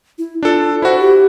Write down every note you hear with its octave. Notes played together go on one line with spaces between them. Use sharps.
E4
D4 F4 A4
E4 F#4 C5
G4